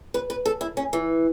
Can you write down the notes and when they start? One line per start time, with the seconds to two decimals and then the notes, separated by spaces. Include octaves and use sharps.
0.14 B4
0.30 B4
0.46 A4
0.61 E4
0.77 C#4
0.93 E3